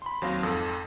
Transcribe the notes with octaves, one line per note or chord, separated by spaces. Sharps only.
B5 C6
D#2 F#3 C4 F5 C6 A#6
F2 G#2 A4 D#6